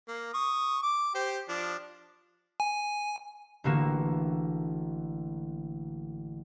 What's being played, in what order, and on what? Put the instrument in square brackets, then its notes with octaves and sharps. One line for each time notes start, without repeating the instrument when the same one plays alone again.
[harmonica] A#3
C#6 D#6
D6
G4 C5
F3 D4
[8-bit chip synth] G#5
[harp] A1 A2 D3 A#3 F#4 E7